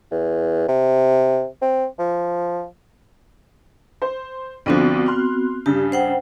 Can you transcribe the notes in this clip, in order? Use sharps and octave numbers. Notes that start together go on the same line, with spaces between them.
E2
C3
C4
F3
C5
C2 D3 F3 B3 C4 F#4
C6 F6 F#6
G2 C#3 G4
C5 F#5 G5